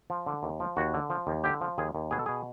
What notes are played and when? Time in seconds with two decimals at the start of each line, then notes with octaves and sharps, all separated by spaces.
0.10 F3
0.26 D3
0.43 D#2
0.60 F3
0.77 D#2 F#4
0.94 D3
1.10 F3
1.27 D#2
1.44 D3 G4
1.61 F3
1.78 D#2 G#4
1.95 D#2
2.11 B2 G#4
2.19 A4
2.26 B2 G#4